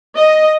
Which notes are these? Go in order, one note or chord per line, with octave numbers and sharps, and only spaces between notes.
D#5